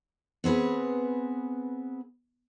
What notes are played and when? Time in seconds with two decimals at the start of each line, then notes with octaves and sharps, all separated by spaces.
0.44 B3 C4 G#4 B4